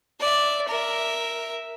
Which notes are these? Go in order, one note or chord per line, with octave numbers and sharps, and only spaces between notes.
D5 E5
A#4 E5